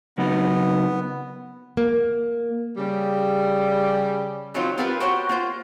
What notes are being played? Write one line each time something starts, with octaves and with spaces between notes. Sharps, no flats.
C#3 F#3 B3 D#4
A#3
C#3 G3
D#3 F#3 G3 C4 D#4 F4
B3 C4 F4 G4 A#4 B4
F#4 G4 C5 C#5 F#5 G5
A#3 F4 C5